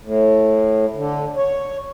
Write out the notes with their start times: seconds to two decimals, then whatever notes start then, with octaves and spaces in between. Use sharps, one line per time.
0.01 A2
0.95 D3
1.36 C#5